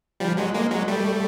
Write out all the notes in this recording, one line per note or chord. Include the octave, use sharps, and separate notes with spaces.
F3 G3
F#3 G#3
G#3 A#3
F#3 G#3
G3 A3